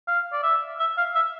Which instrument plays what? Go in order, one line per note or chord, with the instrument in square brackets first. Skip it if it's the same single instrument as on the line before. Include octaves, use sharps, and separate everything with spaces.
[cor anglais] F5
D5
E5
E5
F5
E5